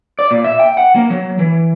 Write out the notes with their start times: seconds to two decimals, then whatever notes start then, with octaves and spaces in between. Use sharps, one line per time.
0.19 D5
0.31 A#2
0.44 E5
0.60 G5
0.77 F#5
0.96 A#3
1.10 F#3
1.39 E3